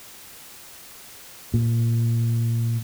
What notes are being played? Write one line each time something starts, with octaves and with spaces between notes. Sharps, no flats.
A#2